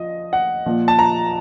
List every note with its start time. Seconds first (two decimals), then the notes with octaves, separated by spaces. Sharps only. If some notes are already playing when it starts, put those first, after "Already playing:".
Already playing: F3 D#5
0.33 F#5
0.66 A#2 F3
0.88 A5
0.99 A#5